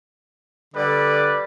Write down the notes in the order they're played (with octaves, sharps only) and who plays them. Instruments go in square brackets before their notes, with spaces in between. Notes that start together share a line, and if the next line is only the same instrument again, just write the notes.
[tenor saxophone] D3 [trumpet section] G3 B4 D5